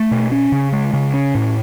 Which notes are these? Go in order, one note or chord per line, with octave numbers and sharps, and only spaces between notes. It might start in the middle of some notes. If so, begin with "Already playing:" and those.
Already playing: A3
B2
C#4
C#3
G#3
C#3
C#4
A2